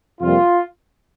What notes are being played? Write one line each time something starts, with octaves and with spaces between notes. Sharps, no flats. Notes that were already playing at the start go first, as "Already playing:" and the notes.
F2 C3 G3 A#3 F4